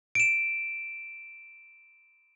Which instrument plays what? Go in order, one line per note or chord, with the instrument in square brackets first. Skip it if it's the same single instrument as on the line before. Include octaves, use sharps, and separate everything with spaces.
[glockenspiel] D7 E7